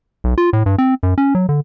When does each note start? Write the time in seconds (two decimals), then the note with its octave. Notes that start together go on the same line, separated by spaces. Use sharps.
0.24 B1
0.38 F4
0.53 A2
0.66 G2
0.78 C4
1.03 F#2
1.18 C#4
1.35 F#3
1.49 D3